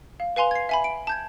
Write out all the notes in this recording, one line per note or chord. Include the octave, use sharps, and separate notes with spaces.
F5
B4 F5 G#5 C6 F7
G#6 C7
E5 G#5 B5
D7
A5 G6 G#6